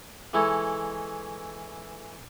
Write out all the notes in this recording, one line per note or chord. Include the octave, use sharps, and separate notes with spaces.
E3 G#3 D#4 E4 A4 C#5